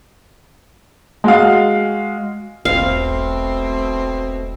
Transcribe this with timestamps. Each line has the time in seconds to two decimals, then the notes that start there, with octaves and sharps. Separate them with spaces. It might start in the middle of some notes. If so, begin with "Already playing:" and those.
1.24 G#3 F#4 F5
2.65 E1 B1 B2 A3 C4 F5